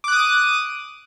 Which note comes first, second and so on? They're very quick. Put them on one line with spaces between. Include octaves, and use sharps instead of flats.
D6 F#6 D#6 D#7